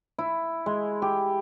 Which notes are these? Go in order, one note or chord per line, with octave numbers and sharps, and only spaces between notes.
E4
G#3
G4